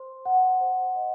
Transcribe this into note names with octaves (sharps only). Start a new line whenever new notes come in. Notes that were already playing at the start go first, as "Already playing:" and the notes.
Already playing: C5 C6
F#5
C5
D#5